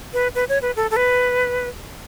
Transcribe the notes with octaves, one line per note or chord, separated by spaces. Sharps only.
B4
B4
C#5
B4
A4
A4
B4